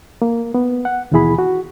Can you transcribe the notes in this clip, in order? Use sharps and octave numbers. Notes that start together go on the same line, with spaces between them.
A#3
B3
F#5
D#2 B2 E3 E4 G#4 B5
F#4